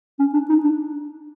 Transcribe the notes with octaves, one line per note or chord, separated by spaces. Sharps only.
C#4
D4
D#4
D4